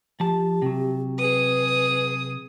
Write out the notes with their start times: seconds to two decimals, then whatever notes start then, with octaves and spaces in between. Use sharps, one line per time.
0.20 F3 G4 A5
0.62 C3 F#3
1.18 G#4 B4 D#6